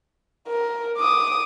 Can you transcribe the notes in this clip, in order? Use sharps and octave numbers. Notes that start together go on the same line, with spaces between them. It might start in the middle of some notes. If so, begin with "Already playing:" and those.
A#4
D6 D#6